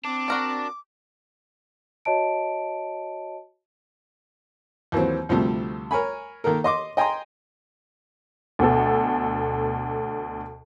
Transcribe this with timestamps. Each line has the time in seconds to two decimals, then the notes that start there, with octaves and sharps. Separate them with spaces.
0.05 C4 D4 D6
0.28 F#4 A#4 D5
2.05 F#4 C#5 D#5 A5 D7
4.92 D#2 E3 F#3 C4
5.29 D2 C3 F3 G3 A3
5.91 A#4 C#5 G#5 B5
6.44 D#3 A#3 A4 A#4
6.64 D#5 C6 D6
6.97 D#5 G5 G#5 A#5 C6
8.59 D2 B2 A4